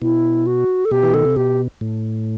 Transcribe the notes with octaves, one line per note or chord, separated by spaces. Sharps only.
B2 E4
F#4
A4
B2 G4
E3
D#3 A4
C3
B2 G4
A2